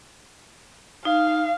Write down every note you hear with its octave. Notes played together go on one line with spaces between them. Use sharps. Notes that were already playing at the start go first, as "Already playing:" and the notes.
D#4 F5